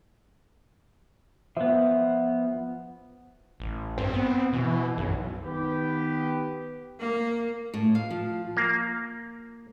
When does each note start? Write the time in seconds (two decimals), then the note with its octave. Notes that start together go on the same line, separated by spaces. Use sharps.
1.57 F3 B3 E5
3.60 A1
3.98 G2 C4
4.14 B3
4.53 B2 E3
4.97 B1 F#2
5.43 D#3 B3 G4 B4
6.99 A#3
7.74 A2
7.95 F5
8.10 F3
8.57 A#3